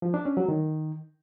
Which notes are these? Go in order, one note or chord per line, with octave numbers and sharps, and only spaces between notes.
F3
D4
C#4
F#3
D#3